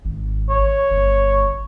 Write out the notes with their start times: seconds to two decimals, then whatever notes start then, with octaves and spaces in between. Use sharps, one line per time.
0.05 G#1
0.50 C#5
0.91 G1